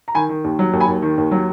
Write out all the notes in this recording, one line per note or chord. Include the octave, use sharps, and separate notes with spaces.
A#5
D#3 G#5 B5
D#3
D#2
F#3
D#2
G#5 B5
D#2
D#3
D#2
F#3